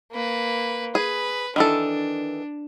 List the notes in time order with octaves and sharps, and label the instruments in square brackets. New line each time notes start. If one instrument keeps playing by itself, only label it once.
[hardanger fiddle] A#3 B4
[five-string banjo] G#4 [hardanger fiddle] B4
[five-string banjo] D#3 E3 A4 [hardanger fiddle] D4